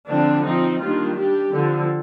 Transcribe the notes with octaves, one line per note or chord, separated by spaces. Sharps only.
D3 F3 C4 D4
F3 C4 D#4
D#3 G3 A#3 D4 F4
G3 D4 G4
D3 F3 C4